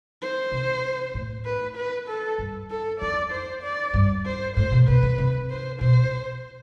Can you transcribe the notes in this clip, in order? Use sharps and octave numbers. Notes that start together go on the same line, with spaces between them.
C5
C3
A2
B4
B4
A4
G2
A4
F2 D5
C5
D5
G2
C5
A2 C5
B2
C3 B4
D3
C3
C5
B2 C5